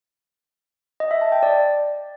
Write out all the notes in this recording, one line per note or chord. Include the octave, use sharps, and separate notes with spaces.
D#5
E5
A5
G5
D5